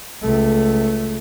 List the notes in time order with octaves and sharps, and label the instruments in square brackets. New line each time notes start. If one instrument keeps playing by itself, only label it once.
[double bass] C#2 A3